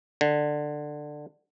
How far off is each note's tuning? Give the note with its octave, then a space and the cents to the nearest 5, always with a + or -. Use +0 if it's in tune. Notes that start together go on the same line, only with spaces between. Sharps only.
D3 +15